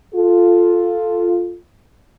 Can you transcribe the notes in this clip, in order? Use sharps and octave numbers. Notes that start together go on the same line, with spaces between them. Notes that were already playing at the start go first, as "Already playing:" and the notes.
F4 A4